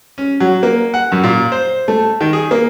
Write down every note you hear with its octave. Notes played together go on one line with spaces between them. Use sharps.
C#4
F#3
A#3
F#5
F#2
A#2
C5
A3
D#3
G#4
A#3